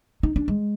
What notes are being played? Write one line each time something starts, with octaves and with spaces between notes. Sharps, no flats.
D#4
D4
G#3